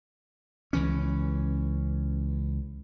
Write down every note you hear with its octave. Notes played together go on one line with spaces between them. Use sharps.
C#2 E3 C#4